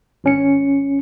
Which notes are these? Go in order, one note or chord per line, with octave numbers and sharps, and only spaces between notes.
G#1 C#4 C#7